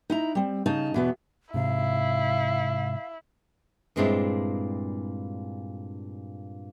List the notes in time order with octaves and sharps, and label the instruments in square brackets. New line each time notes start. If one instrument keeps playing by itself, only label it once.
[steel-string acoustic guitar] D#4 E4 A#5
G3 C4
C#3 D#4 A5
E2 B2 B3
[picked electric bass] G#2 C3 [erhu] E4 [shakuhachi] F5
[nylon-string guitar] G2 A#2 G#3 C4 D4 E4